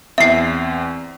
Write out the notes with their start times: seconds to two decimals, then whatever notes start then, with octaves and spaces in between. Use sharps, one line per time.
0.18 E2 C4 E5 C7